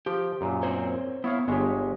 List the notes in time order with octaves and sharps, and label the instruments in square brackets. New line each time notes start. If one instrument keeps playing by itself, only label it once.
[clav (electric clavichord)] F3 [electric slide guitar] G4
[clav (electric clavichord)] F#2 A#2
[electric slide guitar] C4 C5 C#5
[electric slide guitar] B3 [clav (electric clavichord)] E4 C#5 F5
[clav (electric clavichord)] G1 G#3 C#5 [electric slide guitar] B3 G4